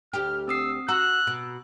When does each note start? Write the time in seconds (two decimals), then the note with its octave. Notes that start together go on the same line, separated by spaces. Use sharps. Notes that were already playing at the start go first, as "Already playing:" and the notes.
0.13 D2 G4 F6
0.48 C4 D#6 E6 C7
0.88 F#4 A#5 E6 F#6
1.27 B2